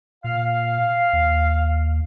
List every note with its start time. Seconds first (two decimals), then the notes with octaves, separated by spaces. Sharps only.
0.24 A#2 F5
1.13 D#2